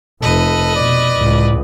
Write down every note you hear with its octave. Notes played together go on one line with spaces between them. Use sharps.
F1 A4 B4 D#5
B2 D5
C#2 A2